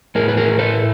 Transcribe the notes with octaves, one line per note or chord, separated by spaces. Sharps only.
A2 G#4 A#4
B4
G#4 A#4
A3 A4 B4